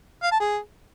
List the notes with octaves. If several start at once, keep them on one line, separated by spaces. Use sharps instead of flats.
F5
A5
G#4